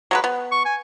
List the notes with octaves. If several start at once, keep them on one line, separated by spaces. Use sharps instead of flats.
F#3 G#3 B4
B3
C#6
G#5